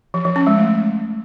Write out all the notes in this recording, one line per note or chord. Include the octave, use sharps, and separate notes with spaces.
F3
F3
C#4
G#3
A3